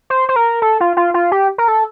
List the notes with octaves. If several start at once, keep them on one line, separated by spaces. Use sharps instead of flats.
C5
C5
A#4
A4
F4
F4
F4
G4
A#4
A4